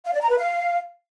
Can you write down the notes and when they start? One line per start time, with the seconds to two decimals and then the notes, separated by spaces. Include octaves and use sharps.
0.05 F5
0.13 D5
0.21 A#5
0.29 B4
0.38 F5